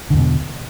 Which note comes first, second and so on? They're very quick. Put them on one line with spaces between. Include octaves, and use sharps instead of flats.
D3 E2 B2